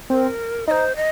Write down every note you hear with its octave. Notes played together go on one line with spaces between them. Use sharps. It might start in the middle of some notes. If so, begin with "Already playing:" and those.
C4 A#4
D#4 C5 D#5
D#5